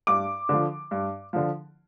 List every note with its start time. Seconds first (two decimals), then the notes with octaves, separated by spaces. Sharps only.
0.07 G2 D6
0.49 D3 F3
0.91 G2
1.33 D3 F3